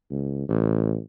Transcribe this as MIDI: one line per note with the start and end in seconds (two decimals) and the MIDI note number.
0.10 0.47 37
0.48 0.98 33